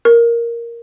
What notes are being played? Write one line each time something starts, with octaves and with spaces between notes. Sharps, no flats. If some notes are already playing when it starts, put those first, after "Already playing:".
A#4